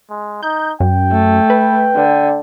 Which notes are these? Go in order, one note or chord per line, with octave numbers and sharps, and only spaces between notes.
G#3
D#4 G6
F#2 G5
A3
B4
D3